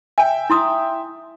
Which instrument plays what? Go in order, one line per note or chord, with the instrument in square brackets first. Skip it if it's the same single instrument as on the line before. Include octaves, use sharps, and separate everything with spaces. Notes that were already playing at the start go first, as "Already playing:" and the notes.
[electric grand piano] E5 G5 [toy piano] G#5
[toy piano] E4 C6 D#6